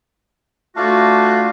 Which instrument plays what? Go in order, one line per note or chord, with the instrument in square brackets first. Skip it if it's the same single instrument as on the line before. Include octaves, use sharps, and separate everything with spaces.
[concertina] A3 F4 [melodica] D4 F5 A5 [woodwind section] F#4